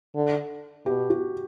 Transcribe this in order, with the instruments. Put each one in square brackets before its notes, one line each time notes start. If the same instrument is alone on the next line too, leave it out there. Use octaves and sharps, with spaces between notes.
[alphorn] D3
[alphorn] B2 [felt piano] G4
[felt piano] F#4